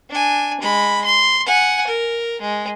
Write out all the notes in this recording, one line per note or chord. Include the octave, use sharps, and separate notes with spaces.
D4 G#5
G#3 B5
C6
F#5 G#5
A#4
G#3